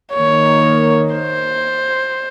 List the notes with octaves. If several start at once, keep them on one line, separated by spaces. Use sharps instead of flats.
D#3 A#3 C#5
C5